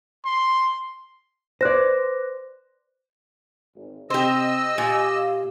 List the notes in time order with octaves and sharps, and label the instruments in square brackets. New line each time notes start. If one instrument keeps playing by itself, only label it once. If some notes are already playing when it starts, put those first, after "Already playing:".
[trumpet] C6
[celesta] B4 F#6 A#6 [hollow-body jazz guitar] C5 D5
[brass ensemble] G#1
[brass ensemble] C3 [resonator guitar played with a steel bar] G4 C5 [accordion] D#5 E6
[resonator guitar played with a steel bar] A#2 [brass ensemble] G4 [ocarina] G#5
[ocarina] F5